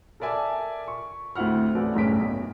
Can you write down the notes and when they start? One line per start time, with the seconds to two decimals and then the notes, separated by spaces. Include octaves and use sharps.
0.20 A4 A#4 D5 E5 G#5 A5
0.88 C#6
1.35 D2 C4 E4 F#5 F6
1.75 A1 A3 F#4 B4 D5 G#5
1.95 F#1 C2 A2 C#4 B6 D7
2.17 B1